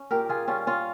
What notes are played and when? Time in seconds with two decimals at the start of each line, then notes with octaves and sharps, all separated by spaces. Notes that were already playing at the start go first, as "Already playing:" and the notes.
Already playing: C#4
0.11 A#2 G4 A#4
0.29 F4 G#4
0.48 G3 C#4 F4
0.67 C#4 F4